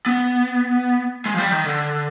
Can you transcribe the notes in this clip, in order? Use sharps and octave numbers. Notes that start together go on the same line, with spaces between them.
B3
G#3
F3
G3
D#3
D3